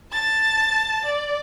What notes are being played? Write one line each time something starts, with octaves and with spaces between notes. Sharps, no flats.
A5 A6
D5